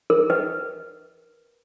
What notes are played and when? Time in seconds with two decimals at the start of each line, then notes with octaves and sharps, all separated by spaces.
0.10 A#4
0.30 B4